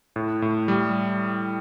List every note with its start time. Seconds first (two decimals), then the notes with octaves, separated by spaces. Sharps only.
0.16 A2
0.42 A2
0.68 G3